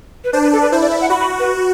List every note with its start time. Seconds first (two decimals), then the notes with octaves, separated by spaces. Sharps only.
0.24 B4
0.33 D4 C5
0.43 B4
0.53 A4
0.62 B4
0.71 E4 C5
0.82 D5
0.91 E5
1.01 F#5
1.10 F#4 B5
1.20 B5
1.39 B4